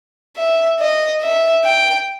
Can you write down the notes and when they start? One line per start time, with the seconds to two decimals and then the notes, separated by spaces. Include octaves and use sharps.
0.36 E5
0.79 D#5
1.21 E5
1.64 G5